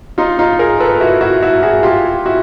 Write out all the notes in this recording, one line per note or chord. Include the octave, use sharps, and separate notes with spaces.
D#4 F4
D#4 F4
G#4 A#4
A4 B4
E4 F#4
E4 F#4
E4 F#4
F#4 G#4
F4 G4
E4 F#4